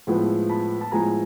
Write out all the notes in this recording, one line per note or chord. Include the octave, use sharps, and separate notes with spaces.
A2 F3 G#3 B3
A5 B5
A5
A2 F3 G#3 B3 G#5 A#5